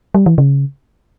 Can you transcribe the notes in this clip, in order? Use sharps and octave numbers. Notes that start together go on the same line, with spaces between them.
G3
E3
C#3